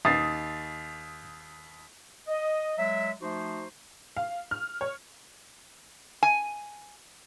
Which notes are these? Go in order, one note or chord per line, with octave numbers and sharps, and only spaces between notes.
D#2 D#6 A6 C7
D#5
F#3 G#3 E5
F3 A3 D#4 F#4 C5
F5
F6
C#5
G#5